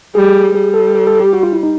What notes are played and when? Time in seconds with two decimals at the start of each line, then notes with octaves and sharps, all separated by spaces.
0.15 G3 G#4
0.55 G3 G#4
0.74 A4
0.95 A4
1.07 A4
1.20 G4
1.33 F#4
1.43 F4
1.53 E4
1.63 D#4